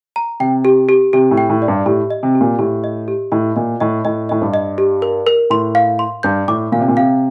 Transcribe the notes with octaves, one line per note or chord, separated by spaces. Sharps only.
A#5
C3 G5
G4
G4
C3 G4
A2
G5
A2
D5
G2
A2 G4
D#5
C3
G4
A#2
A2 G4
D#5
G4
A2 D#5
A#2 D#5
A2 D#5
A2 D#5
A2 D#5
G2
D#5
G4
A#4
A#4
A2 C6
F5
C6
G2 G6
A2 D6
A#2 F5
C3
A#2
C3 F5